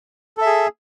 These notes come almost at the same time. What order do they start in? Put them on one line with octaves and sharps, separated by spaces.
A4 E5 G#4